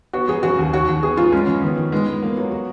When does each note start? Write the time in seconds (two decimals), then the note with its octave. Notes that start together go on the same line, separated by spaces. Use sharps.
0.13 B3 F#4
0.28 F#2 G#4
0.43 C#3 F#4
0.59 D#2
0.73 D#2 F#4
0.88 D#2
1.03 B3 G#4
1.17 F#2 F4
1.32 G#3 C#4
1.47 C#3
1.62 D#3 B3
1.77 D#3
1.92 G#3 B3
2.07 G#3
2.22 A#3 B3
2.37 F#3
2.52 F#4